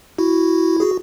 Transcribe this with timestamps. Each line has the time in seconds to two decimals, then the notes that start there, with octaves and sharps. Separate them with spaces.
0.18 E4 F#4
0.80 F#4 G#4